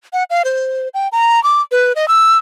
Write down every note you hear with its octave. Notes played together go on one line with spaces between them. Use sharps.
F#5
F5
C5
G5
A#5
D6
B4
D#5
E6